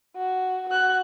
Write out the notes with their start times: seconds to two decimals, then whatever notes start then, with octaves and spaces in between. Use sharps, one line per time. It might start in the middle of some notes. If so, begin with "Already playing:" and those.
0.16 F#4
0.69 F#4 F#6